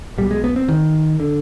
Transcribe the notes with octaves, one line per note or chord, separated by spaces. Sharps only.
B1 B2 G3
G#3
B3
C4
D#3
D3